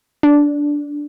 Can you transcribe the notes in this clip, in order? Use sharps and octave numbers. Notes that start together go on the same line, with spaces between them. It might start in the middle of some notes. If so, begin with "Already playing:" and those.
D4